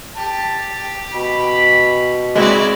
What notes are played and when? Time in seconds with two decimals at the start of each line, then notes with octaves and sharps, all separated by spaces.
0.17 G4 A5
1.13 B2 B5
2.35 G#3 C4 E4 F#4 D5 D6